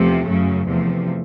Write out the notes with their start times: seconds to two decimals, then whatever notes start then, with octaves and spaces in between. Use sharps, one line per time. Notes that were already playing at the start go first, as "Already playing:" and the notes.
Already playing: E2 C3 F3 A3
0.28 F#2 C#3 F#3
0.67 E2 C3 F3 A3